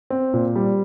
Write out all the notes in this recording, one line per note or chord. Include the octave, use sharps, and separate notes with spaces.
C4
A#2
G3